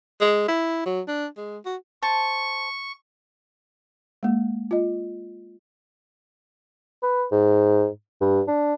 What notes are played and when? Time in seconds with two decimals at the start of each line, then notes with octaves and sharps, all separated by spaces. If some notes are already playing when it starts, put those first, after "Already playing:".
0.20 G#3
0.48 E4
0.86 F#3
1.08 D4
1.37 G#3
1.65 F#4
2.03 C5 A5 C#6
4.23 G#3 A#3
4.71 F4 D#5
7.03 B4
7.32 G#2
8.21 G2
8.47 D4